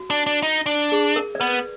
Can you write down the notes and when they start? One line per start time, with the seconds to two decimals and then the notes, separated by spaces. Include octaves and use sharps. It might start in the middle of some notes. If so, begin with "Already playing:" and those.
Already playing: F#4
0.10 D4
0.27 D4
0.43 D#4
0.66 D4
0.92 G#4
1.16 A#4
1.35 D5
1.40 B3 B4